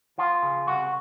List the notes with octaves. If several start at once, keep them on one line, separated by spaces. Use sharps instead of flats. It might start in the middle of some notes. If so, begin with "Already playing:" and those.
F3 F4
C#3
C2 F#4